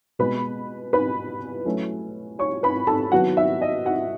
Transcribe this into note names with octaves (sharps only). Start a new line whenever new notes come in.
B2 G#3 B3 B4 B5
B4 B5
F#3 A3 C#4 E4
C#5 C#6
B4 B5
A4 A5
D#3 F#3 B3 E4 F#4 F#5
E5
D#5
F#4 F#5